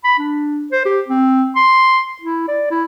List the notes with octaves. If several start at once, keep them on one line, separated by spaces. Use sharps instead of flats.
B5
D4
C5
G4
C4
C6
E4
D5
E4